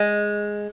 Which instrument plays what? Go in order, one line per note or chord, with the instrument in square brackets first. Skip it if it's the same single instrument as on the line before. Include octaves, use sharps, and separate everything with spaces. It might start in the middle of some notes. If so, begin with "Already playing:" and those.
Already playing: [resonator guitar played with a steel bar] G#3